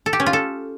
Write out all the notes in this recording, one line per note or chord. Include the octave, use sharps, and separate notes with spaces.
A4
G4
C#4
F4
A4